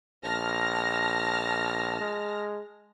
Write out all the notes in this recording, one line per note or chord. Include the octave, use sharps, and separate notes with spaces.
A#1 A5 F6 A#6
G#3